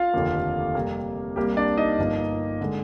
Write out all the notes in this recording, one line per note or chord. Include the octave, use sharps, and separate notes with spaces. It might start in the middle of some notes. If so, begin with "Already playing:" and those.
Already playing: F4 F5
F1 D#2 D3 F3 A#3
F2 C3 G3 A#3
C2 C3 G3 A#3 G4
D4 D5
D#4 D#5
G1 G2 F3 A#3
D3 G#3